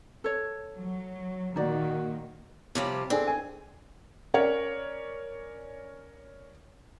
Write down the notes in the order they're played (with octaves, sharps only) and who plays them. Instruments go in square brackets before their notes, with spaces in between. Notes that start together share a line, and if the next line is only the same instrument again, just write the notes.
[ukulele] A4 C#5
[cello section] F#3
[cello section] A#2 D#3 A#3 [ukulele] D#4 D5 [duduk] F#4
[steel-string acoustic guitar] C3 F3 G3 [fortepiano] C#5
[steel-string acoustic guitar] C4 [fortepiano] D4 G#4 A4
[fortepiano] G#5
[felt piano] C#4 A#4 C#5 D5